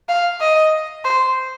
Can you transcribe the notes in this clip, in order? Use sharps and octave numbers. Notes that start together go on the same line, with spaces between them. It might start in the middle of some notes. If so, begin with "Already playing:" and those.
F5
D#5
C5